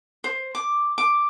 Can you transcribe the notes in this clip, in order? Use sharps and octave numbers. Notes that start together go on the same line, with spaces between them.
C5
D6
D6